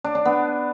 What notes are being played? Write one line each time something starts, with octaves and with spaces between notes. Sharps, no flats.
D4
D4
B3